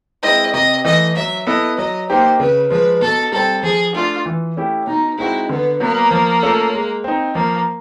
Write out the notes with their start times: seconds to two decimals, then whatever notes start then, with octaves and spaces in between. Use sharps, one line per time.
0.23 G#3 C4 E4 D#5
0.54 C3 D#5
0.85 E3 A3 D#5
1.16 F#3 E5
1.47 B3 E4 A4 D#5
1.77 F#3 D#5
2.09 A#3 D#4 G4 C5
2.39 C#3 B4
2.70 F3 G#3 B4
3.02 B2 A4
3.32 G3 C4 A4
3.63 F3 G#4
3.95 A3 D4 F4
4.26 E3
4.57 A3 C#4 E4 G4
4.87 B2 D#4
5.18 G#3 C4 D#4 E4 F#4
5.49 D3 B3
5.80 F#3 A#3 B3
6.11 F3
6.43 A3 C#4 F4 A4
6.74 G#3
7.04 C4 D#4
7.35 F3 A#3